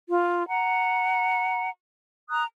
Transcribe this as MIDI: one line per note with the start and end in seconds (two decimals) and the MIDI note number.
0.09 0.45 65
0.48 1.70 78
0.48 1.70 82
2.29 2.44 82
2.29 2.44 87
2.29 2.44 90